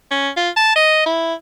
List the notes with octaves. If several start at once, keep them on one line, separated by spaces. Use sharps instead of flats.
C#4
F4
A5
D#5
E4